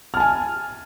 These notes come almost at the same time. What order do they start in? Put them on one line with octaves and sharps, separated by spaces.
F6 A5 G#5